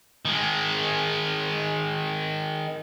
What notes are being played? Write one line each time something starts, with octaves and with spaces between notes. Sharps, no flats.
D#3 G#3